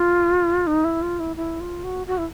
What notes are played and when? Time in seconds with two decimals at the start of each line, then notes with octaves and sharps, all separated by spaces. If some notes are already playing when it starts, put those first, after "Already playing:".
Already playing: F4
0.67 D#4
0.84 E4
1.02 F4
1.20 E4
1.36 E4
1.61 F4
1.84 F#4
2.07 F#4
2.18 E4